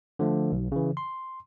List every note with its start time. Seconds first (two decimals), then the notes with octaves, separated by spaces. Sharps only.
0.19 D3 F3 A3
0.52 B1
0.72 C#3 E3
0.97 C6